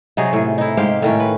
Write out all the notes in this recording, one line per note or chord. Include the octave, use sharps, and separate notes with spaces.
C3 F#3 D#4 G#4
A2 G#4
D#4 E4
G#2 G4 C5 F5
A2 D#3 C#4
B4